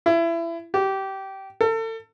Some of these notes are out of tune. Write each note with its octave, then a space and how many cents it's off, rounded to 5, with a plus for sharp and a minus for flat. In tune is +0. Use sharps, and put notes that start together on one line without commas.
E4 +25
G4 -20
A4 +35